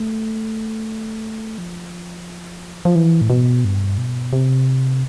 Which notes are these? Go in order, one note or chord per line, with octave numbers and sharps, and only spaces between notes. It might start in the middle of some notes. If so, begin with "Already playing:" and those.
Already playing: A3
F3
F3
E3
A2
B2
G2
B2
C3